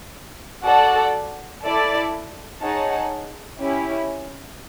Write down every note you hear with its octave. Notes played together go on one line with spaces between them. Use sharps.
F#4 A4 D5 F#5
E4 A4 D5
D#4 G#4 C#5 F#5 A5
C#4 E4 G4